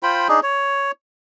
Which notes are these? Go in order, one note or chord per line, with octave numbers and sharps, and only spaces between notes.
F4 C5 G5 B5
D4 D#4 G#4
C#5